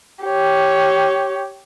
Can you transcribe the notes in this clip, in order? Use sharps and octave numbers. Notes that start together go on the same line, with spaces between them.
G4 C#5